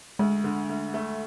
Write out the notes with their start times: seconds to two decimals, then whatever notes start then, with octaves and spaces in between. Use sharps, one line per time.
0.19 D2 G#3
0.44 D3
0.69 D2
0.94 A3